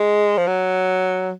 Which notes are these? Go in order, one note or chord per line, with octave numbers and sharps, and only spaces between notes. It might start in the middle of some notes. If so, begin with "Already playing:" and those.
Already playing: G#3
F3
F#3